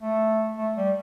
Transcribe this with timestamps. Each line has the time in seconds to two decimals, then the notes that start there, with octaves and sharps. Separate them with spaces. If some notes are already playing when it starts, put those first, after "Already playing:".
0.02 A3
0.57 A3
0.77 G3